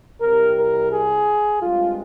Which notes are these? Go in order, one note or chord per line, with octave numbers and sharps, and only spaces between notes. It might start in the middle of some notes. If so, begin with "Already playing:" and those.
C2 C3 G3 A#4
A#4
G#4
G2 F3 G#3 C4 F4